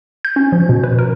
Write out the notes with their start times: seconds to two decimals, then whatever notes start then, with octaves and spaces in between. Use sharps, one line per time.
0.25 G6
0.36 C#4
0.52 F3
0.69 B2
0.84 B4
0.99 A#4